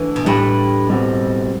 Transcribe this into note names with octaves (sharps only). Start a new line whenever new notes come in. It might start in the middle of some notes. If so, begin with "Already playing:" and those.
Already playing: D3 E3 A3
B2
A2 G3 D4 G4 B4
B2 G3 C4 F#4